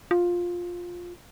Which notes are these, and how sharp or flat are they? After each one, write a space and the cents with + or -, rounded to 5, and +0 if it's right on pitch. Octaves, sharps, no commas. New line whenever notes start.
F4 +10